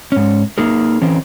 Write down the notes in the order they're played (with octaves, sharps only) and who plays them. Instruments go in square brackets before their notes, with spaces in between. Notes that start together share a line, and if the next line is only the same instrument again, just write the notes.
[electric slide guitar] G#2 C#4
A#3 D#4 G#4 A#4
E3 C4 C#4